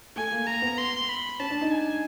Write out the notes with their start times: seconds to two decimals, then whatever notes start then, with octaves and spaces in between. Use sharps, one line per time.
0.16 A3 G#5
0.32 A#3
0.47 A#3 A#5
0.62 B3
0.78 C6
1.09 B5
1.40 C#4 A5
1.51 D4
1.61 D#4
1.71 G#5